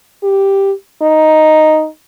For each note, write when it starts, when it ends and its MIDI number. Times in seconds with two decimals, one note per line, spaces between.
0.23 0.72 67
1.02 1.87 63